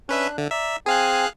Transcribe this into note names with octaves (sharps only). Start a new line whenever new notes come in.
C#4 D4 B4 E5 F#6
D3 E5
D5 E5 A#5
C4 G#4 F5 G#5 F#6